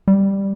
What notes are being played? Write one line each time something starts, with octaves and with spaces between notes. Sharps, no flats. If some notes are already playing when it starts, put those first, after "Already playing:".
G3